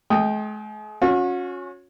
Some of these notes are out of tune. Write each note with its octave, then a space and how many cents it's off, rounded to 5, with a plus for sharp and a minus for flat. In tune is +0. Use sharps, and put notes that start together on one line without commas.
G#3 +45 G5 +0 D#6 +0
C#4 +0 F#4 -40